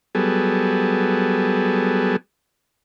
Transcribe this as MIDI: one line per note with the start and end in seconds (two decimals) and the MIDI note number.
0.15 2.16 54
0.15 2.16 55
0.15 2.16 59
0.15 2.16 68
0.15 2.16 69